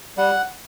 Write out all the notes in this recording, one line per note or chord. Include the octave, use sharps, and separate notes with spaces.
G3 F#5